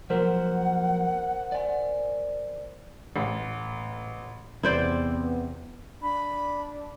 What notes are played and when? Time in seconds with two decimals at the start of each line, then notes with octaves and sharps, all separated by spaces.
0.10 F3 F#3 A#3 A#4 C5 F#5
1.52 D5 G#5
3.16 A1 A2
4.63 E2 C3 B3 C4 E4 C5 D5
6.02 D4 B5